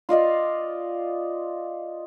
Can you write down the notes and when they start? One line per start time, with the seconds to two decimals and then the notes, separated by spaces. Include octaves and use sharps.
0.09 F4 D5 D#5 F5